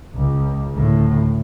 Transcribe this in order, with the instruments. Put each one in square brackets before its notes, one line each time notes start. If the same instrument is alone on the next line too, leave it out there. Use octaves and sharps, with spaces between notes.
[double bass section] C#2
D2 A2